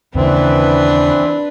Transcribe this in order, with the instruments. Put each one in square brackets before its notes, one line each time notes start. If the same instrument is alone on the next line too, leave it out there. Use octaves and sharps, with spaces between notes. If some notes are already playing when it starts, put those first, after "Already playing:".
[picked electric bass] D#2 C#3 [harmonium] E3 C4 [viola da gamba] D4 B4